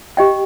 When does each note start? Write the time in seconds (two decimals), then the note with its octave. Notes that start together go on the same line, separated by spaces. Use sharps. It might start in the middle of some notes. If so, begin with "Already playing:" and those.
0.17 G4 D#5 G5